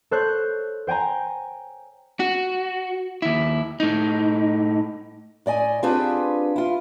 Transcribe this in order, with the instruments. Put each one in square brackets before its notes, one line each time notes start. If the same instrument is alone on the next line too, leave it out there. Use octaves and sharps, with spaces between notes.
[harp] A4 C5 C#5 F#6 G6
C5 G5 G#5 A#5
[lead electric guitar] F#4
D#2 E4
A2 D#4
[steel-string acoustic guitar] A2 D5 D#5 G#5
C4 D4 F4 G4 G#4 B4
E4 F4